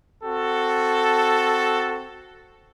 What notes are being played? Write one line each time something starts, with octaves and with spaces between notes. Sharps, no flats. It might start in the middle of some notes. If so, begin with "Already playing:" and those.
C4 F#4 A4